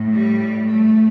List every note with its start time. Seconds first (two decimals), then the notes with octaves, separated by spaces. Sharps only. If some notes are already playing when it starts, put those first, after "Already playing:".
Already playing: A2
0.14 G3
0.67 A3